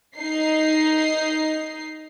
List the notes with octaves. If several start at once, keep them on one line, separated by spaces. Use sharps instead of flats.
D#4 C7